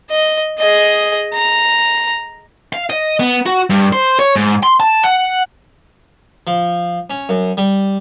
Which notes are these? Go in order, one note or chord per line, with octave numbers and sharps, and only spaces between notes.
D#5
G#4 D#5
A#5
F5
D#5
B3
F#4
G2
C5
C#5
G#2
C6
A5
F#5
F3
C#4
F#2
G3